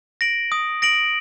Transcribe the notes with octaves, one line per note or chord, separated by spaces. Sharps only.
A#6 D7 F#7
D#6
A#6 D7 F#7